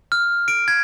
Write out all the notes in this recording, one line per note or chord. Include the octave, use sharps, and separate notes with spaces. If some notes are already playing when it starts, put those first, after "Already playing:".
F6
D7
G#6